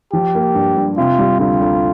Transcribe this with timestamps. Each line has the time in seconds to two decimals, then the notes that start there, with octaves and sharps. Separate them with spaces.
0.13 F3 G4
0.35 A#3
0.55 G2
0.77 G2
0.97 C3 F4
1.19 G3
1.39 D2 F4
1.61 D2